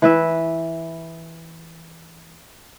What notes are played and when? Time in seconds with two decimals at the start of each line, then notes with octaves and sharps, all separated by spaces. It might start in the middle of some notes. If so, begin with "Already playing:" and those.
0.02 E3 B4 E5